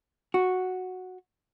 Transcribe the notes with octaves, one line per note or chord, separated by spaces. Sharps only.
F#4